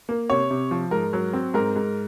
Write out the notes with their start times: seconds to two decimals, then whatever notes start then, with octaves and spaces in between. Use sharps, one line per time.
0.09 A#3
0.30 C3 C#5
0.51 C3
0.71 F3
0.91 G#2 A#4
1.13 F#3
1.33 C4
1.54 G#2 A#4
1.76 G#2